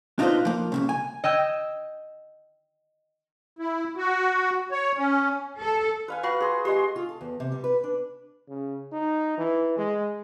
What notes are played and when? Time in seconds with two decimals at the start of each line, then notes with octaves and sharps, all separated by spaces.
0.19 D4 D#4 F4 A4 B4 C5
0.45 F3 A#3
0.72 C2 F2 C#3
0.89 G#5
1.24 D#5 G5 E6 G6 G#6
3.59 E4
3.97 F#4
4.71 C#5
4.97 C#4
5.60 A4
6.08 B4 F5 G#5
6.23 F#4 B4 F5 B5
6.40 G#4 C6
6.65 G#3 G4 C6
6.96 F4
7.09 A4
7.21 E2
7.40 C3
7.52 G3
7.64 B4
7.84 D4
8.48 C#3
8.92 D#4
9.37 E3
9.78 G#3